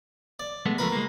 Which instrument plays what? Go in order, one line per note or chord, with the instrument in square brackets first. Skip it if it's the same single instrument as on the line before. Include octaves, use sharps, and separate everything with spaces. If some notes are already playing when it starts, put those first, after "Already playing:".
[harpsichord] D5
[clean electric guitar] G#3 A3 B3
[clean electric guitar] C#2 F3 A3 [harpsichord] A#4 B4
[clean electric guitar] G#3 A#3